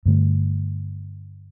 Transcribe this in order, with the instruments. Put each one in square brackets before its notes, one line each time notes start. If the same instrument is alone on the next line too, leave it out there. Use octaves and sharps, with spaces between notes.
[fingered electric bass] G2 D3 A3